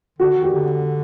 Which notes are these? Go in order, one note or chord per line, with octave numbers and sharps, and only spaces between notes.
D3 F#4
D#3
G4
D3